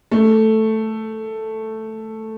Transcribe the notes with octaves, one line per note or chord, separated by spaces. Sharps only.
A3